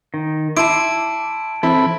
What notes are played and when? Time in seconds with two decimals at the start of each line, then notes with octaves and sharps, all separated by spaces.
0.14 D#3
0.57 E4 A5 C6 D6 D7
1.63 E3 C4 E4 A4 B5